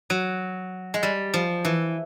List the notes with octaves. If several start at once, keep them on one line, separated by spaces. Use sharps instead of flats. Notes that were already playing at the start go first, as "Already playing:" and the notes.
F#3
G#3
G3
F3
E3